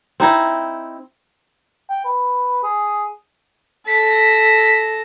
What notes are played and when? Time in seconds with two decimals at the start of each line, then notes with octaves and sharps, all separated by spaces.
0.20 C4 D#4 E4
1.90 G5
2.05 B4
2.63 G#4
3.87 A4 A#6 B6